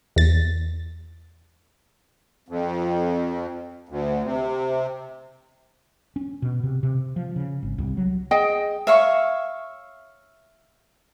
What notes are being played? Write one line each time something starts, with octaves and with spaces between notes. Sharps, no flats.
E2 A6
F2
D2
C3
C#4
B2
C3
C3
F3
C#3
G#1
C2
F#3
G#4 D#5 G5
C#5 E5 F5 C#6